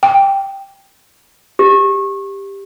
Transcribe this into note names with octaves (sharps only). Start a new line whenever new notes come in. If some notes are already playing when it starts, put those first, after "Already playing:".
G5
G4